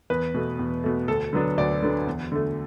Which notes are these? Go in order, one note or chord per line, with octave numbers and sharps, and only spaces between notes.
E2 B4
B2 A3
E2
B2 A3
D2 A4
D3 F#3 B3 D4
D2 D5
D3 F#3 B3 D4
E2
D3 A3